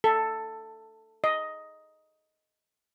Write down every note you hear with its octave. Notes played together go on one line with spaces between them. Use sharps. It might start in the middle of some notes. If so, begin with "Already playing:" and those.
A4
D#5